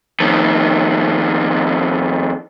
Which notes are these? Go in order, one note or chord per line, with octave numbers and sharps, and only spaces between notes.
F2 D#3